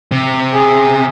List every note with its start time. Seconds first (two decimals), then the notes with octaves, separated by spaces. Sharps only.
0.12 C3
0.54 G#4